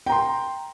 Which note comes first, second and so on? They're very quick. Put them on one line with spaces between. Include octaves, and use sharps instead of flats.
G5 A#5 C6